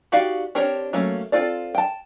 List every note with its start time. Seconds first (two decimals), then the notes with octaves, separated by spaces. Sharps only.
0.12 D#4 F#4 G4 D5 F5
0.55 C4 D4 G4 A#4 C#5
0.93 F#3 A3 A#3 C#4
1.32 C4 F4 A4 D5
1.75 G5 A5